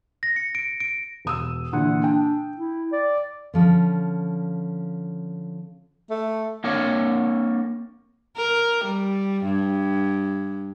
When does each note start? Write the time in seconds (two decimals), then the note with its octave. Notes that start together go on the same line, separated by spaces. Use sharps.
0.23 A#6
0.36 C#7
0.55 D7
0.80 D7
1.25 E1 D#6 E6
1.73 A#2 D3 E3 F#5
2.04 D4 G5
2.57 E4
2.92 D5
3.54 D3 F3 C#4
6.10 A3
6.64 A#3 C4 D4 A#4 C#5
8.36 A#4
8.85 G3
9.45 G2